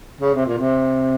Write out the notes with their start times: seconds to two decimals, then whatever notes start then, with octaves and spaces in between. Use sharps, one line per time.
0.21 C#3
0.34 C3
0.46 A#2
0.58 C3